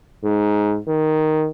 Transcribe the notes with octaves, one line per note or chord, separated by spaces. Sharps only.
G#2
D#3